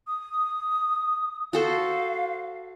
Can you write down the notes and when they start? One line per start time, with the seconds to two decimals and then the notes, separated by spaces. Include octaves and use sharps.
0.07 D#6
1.53 F#4 A4 C5 F5